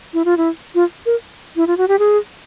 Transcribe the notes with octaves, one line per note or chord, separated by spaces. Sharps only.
E4
F4
E4
F4
A#4
E4
F4
F#4
G4
G#4